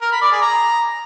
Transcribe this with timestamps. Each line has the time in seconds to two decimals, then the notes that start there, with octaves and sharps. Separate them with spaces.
0.02 A#4
0.12 B5
0.22 D5
0.32 G#4
0.42 A#5